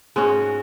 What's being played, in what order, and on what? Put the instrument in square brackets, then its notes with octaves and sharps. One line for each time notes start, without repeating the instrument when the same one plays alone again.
[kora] G#2 G#3 C#4 F#4